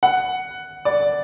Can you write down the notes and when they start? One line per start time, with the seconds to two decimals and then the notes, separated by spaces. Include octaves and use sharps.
0.03 F#5
0.85 D5